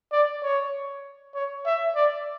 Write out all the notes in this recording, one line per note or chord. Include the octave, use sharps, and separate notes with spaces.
D5
C#5
C#5
E5
D5